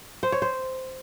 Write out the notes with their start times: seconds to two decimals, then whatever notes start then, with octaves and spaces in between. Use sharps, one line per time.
0.23 C5
0.32 C#5
0.42 C5